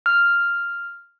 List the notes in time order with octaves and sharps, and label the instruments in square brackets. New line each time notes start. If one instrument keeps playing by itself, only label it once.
[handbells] F6